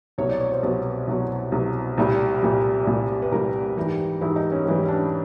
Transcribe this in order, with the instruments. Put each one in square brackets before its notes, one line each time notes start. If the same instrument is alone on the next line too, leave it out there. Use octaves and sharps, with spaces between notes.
[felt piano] C2 B2 F#3 C#5
D5
C#5
C5
C2 B2 F#3 B4
C2 B2 F#3
C2 B2 F#3
C2 A#2 G3
C2 A#2 G3
C2 A#2 G3
B4
C2 A#2 G3 A#4
G#2 E3 G3
G#2 E3 G3 E4
D#4
C#4
G#2 E3 G3
C#4
D4